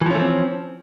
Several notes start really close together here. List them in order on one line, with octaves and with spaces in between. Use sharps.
E3 F3 C#4 A3 C4